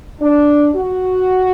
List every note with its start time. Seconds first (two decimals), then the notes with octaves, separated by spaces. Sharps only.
0.21 D4
0.75 F#4